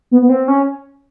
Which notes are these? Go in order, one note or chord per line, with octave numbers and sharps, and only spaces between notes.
B3
B3
C4
C#4